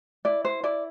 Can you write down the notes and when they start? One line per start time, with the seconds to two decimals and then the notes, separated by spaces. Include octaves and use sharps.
0.25 E4 D5
0.45 C5
0.63 E4 D5